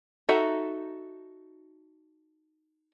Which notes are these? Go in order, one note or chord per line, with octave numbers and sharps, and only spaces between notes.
D#4 F#4 A4 E5 A#5